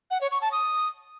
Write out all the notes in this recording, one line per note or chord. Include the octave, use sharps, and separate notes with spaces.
F#5
C#5
C#6
A5
D#6